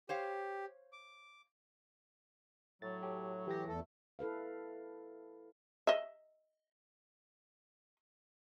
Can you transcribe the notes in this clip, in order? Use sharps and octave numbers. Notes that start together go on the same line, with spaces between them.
G4 C5 C#5 F5
D6
A2 F#3 A6
G4 A4
E3 G4 A#6
E2 A3 A4
E4 A4 B4 F5
D#5 E5